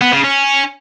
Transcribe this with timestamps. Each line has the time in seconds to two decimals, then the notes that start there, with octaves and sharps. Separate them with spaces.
0.01 B3
0.13 C#3
0.24 C#4